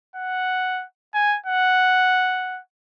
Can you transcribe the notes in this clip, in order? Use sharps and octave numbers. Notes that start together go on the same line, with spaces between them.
F#5
G#5
F#5